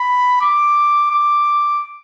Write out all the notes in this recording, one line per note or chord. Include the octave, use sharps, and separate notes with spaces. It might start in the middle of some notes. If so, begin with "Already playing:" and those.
Already playing: B5
D6
D6